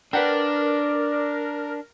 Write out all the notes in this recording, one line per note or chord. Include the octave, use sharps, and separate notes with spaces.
D4 A#4 B4 D5 F#5 G5